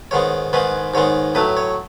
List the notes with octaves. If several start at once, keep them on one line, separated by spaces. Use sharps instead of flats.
G#2 D#3 G#3 B3 C#5
G#2 D#3 G#3 B3 B4
G#2 D#3 G#3 B3 C#5
A2 F#3 A3 B4
C#5